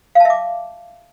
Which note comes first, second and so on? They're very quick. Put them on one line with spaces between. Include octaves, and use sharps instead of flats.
F5 A5 E5 D6